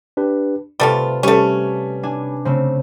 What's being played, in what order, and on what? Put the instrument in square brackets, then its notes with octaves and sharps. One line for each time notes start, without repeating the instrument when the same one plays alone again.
[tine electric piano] D4 G4 B4
[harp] C3 [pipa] G3 A3 F4 [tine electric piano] B4 A5
[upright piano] G3 [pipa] A3 C#4
[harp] D4 G#5
[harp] C#3 A3 C4 [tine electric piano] C5